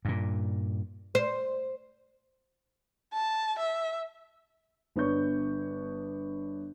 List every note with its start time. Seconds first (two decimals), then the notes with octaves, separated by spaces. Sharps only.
0.05 G2 A#2
1.15 C5
3.13 A5
3.59 E5
4.96 G1 B3 D4 C#5 C#6 G6